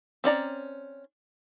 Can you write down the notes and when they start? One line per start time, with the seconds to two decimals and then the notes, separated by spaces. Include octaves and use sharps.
0.24 C4 C#4 D5 A#5